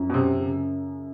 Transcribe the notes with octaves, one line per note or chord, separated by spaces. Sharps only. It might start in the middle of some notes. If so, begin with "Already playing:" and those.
Already playing: F#2 F3
B2
F#2 C3
C#3